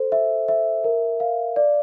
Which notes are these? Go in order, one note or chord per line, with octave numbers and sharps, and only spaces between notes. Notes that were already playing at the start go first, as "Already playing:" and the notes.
Already playing: A4 C5
E5
E5
A#4
F5
D5